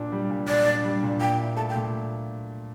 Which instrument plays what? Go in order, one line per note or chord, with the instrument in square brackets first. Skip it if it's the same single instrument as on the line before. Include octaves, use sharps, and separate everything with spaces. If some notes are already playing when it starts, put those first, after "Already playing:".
Already playing: [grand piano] A#2 D4
G3
A#2
[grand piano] A#2 [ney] D5
[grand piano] D4
G3
A#2
[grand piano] A#2 [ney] G5
[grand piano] E4
[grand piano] A3 [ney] A5
[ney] G5
[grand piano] A#2